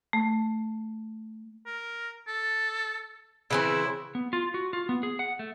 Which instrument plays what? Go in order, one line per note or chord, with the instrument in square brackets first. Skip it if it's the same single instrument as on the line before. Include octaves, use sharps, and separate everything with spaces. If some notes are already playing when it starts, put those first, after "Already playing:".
[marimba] A3
[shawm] A#4
A4
[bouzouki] C#3 E3 C4 [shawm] E4
[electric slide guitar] B3
F4
F#4
F4
B3
G#4
F#5
A3